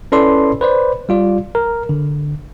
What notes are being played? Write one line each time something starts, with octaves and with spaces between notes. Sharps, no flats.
C#4 E4 A4 B4 D5 C6
B4 C5 D5
G3 F4 D5
A#4
D3